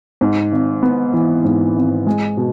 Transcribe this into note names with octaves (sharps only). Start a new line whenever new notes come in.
G#2
G#1
B3
E3
G#2
G#1
G#3
B2